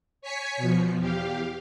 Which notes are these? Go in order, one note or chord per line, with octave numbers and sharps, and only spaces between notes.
C#5 G#5 B6 C#7
B2 F3
E2 G4 F5